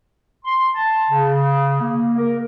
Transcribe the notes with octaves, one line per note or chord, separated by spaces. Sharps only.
C6
A5
C#3
A#3
A#4